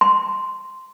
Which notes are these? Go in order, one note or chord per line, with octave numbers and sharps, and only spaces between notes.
C6